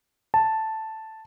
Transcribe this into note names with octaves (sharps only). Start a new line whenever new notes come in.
A5